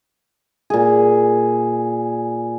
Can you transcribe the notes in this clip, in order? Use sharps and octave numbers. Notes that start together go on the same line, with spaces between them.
A#2 G#4